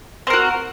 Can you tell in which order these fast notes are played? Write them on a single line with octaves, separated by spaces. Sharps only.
C4 A#4 F#4